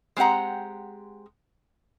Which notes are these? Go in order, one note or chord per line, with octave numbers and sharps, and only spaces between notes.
G#3 C4 G4 F#5 A#5